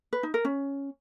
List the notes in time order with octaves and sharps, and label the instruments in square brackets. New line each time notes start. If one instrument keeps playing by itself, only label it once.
[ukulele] B4
D#4
A#4
C#4